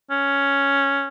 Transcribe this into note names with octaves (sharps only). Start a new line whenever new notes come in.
C#4